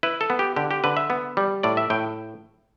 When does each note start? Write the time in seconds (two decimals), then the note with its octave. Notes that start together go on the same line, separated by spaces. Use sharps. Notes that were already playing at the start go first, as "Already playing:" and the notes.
0.03 E4 B4
0.21 A4
0.30 B3
0.39 G4
0.56 D3 G4
0.71 G4
0.84 D3 B4
0.97 E5
1.10 B3
1.37 G3
1.63 A2 D5
1.77 E5
1.90 A2 G5